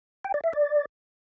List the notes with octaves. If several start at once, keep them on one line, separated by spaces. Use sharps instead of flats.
G5
D5
E5
D5